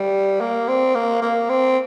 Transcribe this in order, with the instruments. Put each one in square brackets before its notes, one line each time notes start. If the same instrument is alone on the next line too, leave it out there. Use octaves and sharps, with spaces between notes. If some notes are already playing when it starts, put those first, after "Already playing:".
Already playing: [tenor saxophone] G3
A#3
C4
A#3
A#3
C4